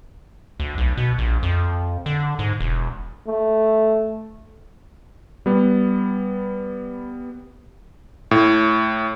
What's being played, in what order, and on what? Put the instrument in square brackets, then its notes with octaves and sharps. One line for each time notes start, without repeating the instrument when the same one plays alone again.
[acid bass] D2
B1
B2
A#1
F2
D3
G#2
E1
[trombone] A3
[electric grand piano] G3 B3
A2